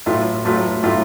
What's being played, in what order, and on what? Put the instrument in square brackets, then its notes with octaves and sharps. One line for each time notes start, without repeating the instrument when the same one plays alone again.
[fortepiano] A1 A2 F#3 A3 F4
A1 A2 F#3 A3 F4
A2 F#3 A3 F4